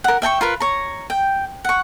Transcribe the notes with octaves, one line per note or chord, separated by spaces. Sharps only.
A#4 F#5
E5 G5 A5 C#6
F4 A#4 B4
C#5 A#5
G5
F#5 C#6